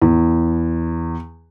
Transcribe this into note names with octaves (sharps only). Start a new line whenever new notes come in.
E2